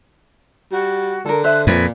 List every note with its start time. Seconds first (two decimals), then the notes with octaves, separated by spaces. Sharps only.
0.72 G3 F#4
1.26 D3 A4 A#4
1.44 C5 E5 F#6
1.67 F2 A#2 B4